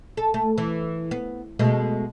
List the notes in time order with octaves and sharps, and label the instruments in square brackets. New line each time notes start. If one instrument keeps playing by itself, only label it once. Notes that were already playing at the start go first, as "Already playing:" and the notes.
[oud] A4
A3
E3
B3
B2 G#3 A3